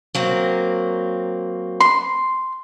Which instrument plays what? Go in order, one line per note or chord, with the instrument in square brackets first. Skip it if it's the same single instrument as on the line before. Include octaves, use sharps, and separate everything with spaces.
[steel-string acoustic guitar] F#3 A#3 C4
[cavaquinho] C6